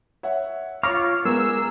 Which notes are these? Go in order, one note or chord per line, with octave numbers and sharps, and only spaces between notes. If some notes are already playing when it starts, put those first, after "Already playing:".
C#5 E5 F#5
F4 C#5 F5 C#6 D6 A#6
G#3 B3 G#4 A#4 E6